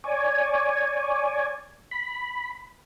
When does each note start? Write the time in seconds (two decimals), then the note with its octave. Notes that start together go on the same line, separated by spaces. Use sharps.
0.04 C#5 D5 G#5
1.91 B5